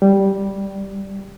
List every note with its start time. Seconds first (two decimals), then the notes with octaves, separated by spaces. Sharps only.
0.02 G3